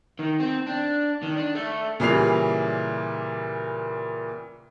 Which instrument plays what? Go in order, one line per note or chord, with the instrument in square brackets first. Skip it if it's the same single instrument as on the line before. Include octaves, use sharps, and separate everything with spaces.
[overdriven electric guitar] D#3
C4
D4
D#3
D4
A3
[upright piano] A#2 C#3 E3 G3 C7 F7